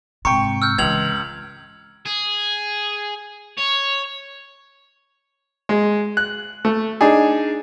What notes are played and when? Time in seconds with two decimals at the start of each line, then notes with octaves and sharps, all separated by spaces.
0.25 G#2 C3 G5 A#5 C#6 C#7
0.62 E6 F6 G6
0.78 C#2 C#3 E3 G#6 F7 F#7
2.06 G#4
3.58 C#5
5.69 G#3
6.17 F#6
6.65 A3
7.01 D4 D#4 G#4